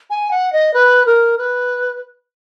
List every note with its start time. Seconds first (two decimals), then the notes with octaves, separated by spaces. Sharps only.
0.10 G#5
0.31 F#5
0.53 D#5
0.74 B4
1.06 A#4
1.38 B4